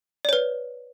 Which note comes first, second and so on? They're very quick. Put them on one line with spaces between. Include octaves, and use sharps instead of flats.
D5 C#5 B4